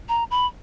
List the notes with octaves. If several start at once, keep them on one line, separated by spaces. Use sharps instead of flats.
A#5
B5